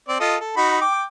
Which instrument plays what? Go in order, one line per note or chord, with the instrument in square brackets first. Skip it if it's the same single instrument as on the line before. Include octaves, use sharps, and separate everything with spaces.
[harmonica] C4 D5
F4 A4 D#5
A4
D#4 F#4 B5
G5 D6